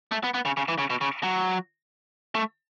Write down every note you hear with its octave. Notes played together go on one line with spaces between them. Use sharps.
A3
B3
B3
C#3
C#3
E3
C#3
B2
C#3
F#3
A3